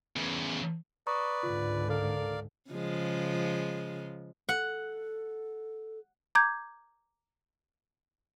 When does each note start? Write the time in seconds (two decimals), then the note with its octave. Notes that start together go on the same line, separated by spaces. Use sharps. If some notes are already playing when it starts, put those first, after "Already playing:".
0.16 E2 C#3
1.07 B4 D5 A#5 C#6 D#6
1.43 C#2 G#2 D3 F4
1.89 A4 A#4 D5 F5
2.70 C#3 F3 G#3
4.49 A4 F#5
6.35 A#5 D6 G6 G#6